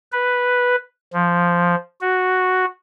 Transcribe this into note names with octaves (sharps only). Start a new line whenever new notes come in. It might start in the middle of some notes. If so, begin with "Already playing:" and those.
B4
F3
F#4